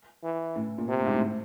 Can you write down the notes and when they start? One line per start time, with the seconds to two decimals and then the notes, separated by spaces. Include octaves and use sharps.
0.24 E3
0.56 A2
0.78 A#2
0.88 C3
1.00 A2
1.06 G#2
1.15 A2